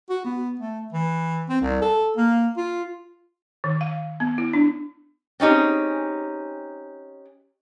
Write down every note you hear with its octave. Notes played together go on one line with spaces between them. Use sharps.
F#4
B3
A3
E3
C4
C2
A4
A#3
F4
D#3
F5
B3
E4
D4
C4 C#4 D#4 G4 G#4